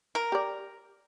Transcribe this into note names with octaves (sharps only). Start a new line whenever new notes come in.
A#4
G4 D5